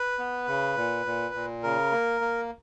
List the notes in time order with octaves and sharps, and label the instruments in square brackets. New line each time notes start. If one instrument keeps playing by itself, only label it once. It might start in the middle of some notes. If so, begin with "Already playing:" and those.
Already playing: [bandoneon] B4
B3
C#3
A#2
A#2
A#2
C#3 A#4
A#3
A#3